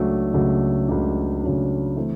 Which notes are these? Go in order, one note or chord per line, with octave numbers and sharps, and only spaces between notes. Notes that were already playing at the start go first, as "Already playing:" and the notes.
Already playing: C#2 C#3 F#3 A3 D4
C#2 C#3 F#3 A3 D4
C#2 C#3 F#3 A3 D4
C#2 C#3 F#3 A3 D4
E3 A3 C4